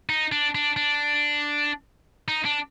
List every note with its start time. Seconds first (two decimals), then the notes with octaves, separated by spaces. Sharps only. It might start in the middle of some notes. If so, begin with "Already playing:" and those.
0.09 D#4
0.32 D4
0.55 D4
0.77 D4
2.28 D#4
2.45 D4